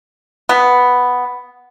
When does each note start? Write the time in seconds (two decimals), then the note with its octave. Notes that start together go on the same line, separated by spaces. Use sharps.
0.49 B3